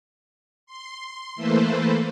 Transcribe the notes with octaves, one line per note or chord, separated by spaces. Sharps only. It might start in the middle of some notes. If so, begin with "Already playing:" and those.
C6
E3 A3 A#3 A4 B4 C5